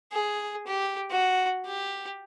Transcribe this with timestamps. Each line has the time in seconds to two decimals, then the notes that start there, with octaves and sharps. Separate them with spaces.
0.12 G#4
0.67 G4
1.10 F#4
1.66 G4